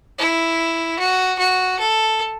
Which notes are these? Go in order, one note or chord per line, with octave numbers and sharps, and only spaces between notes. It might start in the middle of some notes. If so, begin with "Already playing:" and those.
E4
F#4
F#4
A4